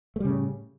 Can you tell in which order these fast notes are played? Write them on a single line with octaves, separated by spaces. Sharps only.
A3 G3 C#3 A2